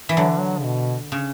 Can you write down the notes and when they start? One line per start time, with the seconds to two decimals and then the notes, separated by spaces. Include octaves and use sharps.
0.09 E3
0.17 D3 F#3
0.29 E3
0.39 F#3
0.58 C#3
0.64 B2
1.12 C#3